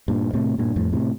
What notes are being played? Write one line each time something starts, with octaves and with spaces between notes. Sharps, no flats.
G2 A#2
A2 C3
G2 A#2
F2 A2
A2 C3